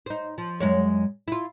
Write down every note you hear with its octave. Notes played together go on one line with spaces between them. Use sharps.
D#4 C5
F3
F#2 G#3 C#5
E4 F4